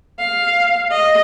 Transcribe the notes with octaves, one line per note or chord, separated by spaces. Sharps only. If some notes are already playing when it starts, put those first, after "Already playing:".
F5
D#5